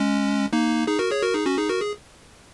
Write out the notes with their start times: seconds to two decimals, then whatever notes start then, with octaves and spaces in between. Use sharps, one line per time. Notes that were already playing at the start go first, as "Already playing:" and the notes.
Already playing: G#3 C#4
0.53 A#3 D#4
0.87 D#4 G#4
0.99 F#4 A#4
1.11 G#4 C#5
1.23 F#4 A#4
1.34 D#4 G#4
1.46 C#4 F#4
1.58 D#4 G#4
1.69 F#4 A#4
1.81 G#4